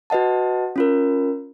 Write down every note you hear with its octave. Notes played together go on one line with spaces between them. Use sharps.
F#4 B4 D#5 F#5 A5
C#4 F4 A#4